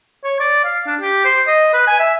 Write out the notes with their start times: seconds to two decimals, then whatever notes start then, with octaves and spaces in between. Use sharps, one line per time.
0.24 C#5
0.40 D5
0.64 F5
0.86 D4
1.01 G4
1.24 C5
1.47 D#5
1.73 B4
1.87 G#5
1.99 E5